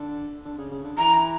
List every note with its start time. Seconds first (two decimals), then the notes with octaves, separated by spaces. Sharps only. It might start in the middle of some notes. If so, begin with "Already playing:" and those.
Already playing: D3
0.45 D3
0.58 C#3
0.71 C#3
0.84 D3
0.97 E3 A#5